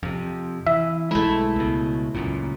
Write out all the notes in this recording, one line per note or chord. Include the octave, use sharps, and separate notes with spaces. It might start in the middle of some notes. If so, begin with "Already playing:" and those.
F2 C3
E3 E5
B1 G#3 A3 E4
C#2 B2
C#2 F#2 A#2